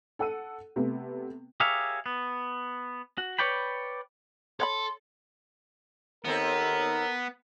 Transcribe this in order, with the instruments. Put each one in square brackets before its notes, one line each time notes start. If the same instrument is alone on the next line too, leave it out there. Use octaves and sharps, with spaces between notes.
[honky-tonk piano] A4 F#5 E6 D#7
C3 A3 B3
[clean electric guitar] G4 G#4 A#4 C#5 E5 F5
B3
F#4
B4 C#5 D5 G5 B5
[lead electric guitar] A4 [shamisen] C#5 F#5 B5 [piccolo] C6
[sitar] D#2 C4 A4 [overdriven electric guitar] B3 [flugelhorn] A#4